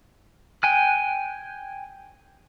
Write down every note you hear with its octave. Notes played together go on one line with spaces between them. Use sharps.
G5 G#5 F#6